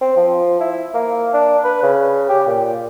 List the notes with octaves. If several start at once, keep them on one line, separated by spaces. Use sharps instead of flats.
C4
F3
E4
A#3
D4
B4
C#3
G4
A#2